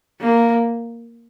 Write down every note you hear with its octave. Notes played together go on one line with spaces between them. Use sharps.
A#3